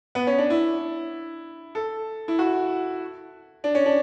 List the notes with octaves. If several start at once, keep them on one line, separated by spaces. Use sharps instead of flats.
B3
C#4
D4
E4
A4
E4
F#4
D4
C#4
D4